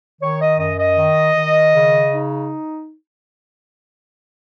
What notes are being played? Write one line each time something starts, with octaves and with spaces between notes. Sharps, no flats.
D#3 C#5
D#5
F#2 D#5
D#5
D#3
D#3
C#3
D#4